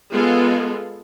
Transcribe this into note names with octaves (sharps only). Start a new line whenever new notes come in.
G#3 B3 F4 G#4 A4